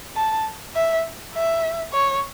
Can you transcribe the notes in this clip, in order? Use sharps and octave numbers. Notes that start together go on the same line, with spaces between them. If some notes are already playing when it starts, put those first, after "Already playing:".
A5
E5
E5
C#5